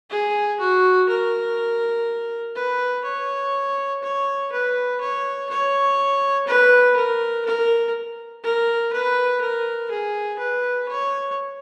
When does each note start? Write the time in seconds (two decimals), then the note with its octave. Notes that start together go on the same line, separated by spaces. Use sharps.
0.10 G#4
0.59 F#4
1.08 A#4
2.55 B4
3.04 C#5
4.02 C#5
4.52 B4
5.00 C#5
5.49 C#5
6.47 B4
6.96 A#4
7.45 A#4
8.44 A#4
8.92 B4
9.41 A#4
9.90 G#4
10.39 B4
10.88 C#5